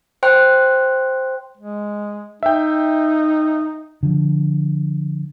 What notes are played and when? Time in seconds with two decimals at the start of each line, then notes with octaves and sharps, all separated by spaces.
0.23 C5 G5 C6 F#6
1.57 G#3
2.43 D#4 E5 G5
4.03 D3 F3